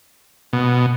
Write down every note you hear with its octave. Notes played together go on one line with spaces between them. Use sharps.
B2